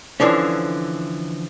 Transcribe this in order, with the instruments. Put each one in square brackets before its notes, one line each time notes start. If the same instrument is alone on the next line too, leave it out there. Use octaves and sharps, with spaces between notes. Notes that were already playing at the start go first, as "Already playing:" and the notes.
[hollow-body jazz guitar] D3 E3 F3 C#4